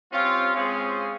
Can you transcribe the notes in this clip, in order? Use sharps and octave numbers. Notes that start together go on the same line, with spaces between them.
G3 C4 C#4 F4
G#3 C4 C#4 F4 G#4 C5